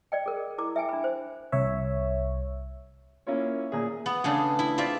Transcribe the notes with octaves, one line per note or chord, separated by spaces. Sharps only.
D5 D#5 G5
G#4 A#4
E4 A#4 D6
E5 G5 G#5
D4 B5
C5
C2 C#5 E5
A#3 C#4 E4 F4 C#5
A#2 G#4 E5
B3
C#3 A3 D4 G#4
E4
C4 F4 D5 E5